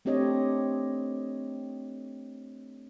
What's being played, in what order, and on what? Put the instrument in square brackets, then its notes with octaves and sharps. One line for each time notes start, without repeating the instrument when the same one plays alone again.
[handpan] A3 C4 D4 G4 C#5 D#5